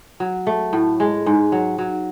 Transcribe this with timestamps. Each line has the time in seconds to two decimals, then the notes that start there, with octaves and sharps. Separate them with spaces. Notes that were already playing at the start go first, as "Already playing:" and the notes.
0.20 F#3
0.47 A3
0.73 A2
1.00 G#3
1.26 G#2
1.52 F#3
1.78 F#3